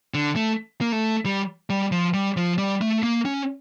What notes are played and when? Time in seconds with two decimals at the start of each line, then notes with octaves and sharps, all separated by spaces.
0.14 D3
0.36 A3
0.81 A#3
0.92 A3
1.26 G3
1.70 G3
1.92 F3
2.14 G3
2.37 F3
2.58 G3
2.81 A3
3.03 A#3
3.25 C#4